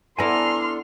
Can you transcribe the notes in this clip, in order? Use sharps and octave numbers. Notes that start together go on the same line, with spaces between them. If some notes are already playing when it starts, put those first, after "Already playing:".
B3 D4 E4 A4 G#5 A#5 C6 F6